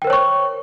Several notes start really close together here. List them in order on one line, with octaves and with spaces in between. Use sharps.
G5 A#4 C5 C#5 C#6